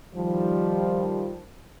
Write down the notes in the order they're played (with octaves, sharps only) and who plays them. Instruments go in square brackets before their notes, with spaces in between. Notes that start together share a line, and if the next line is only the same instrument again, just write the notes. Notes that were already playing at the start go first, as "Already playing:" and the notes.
[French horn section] D#3 F3 G3